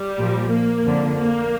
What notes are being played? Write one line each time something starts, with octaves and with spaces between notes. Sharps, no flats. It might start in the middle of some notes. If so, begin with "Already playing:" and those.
Already playing: G3
A#2 F3
A#3
F2 D3 F3
A#3